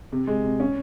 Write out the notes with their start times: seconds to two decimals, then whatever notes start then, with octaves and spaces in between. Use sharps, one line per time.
0.12 C3
0.27 G#3
0.44 C3
0.60 C#4